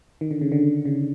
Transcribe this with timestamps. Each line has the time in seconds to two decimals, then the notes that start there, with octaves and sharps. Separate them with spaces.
0.21 D#3
0.31 D3
0.41 C#3
0.52 D3
0.85 C#3